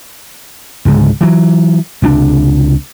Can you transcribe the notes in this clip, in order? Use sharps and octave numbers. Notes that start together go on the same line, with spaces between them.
C#2 G#2 D3 G#3
E3 F#3
C#2 C3 C4 D4